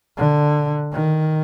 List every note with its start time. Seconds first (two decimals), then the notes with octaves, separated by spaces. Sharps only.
0.17 D3
0.93 D#3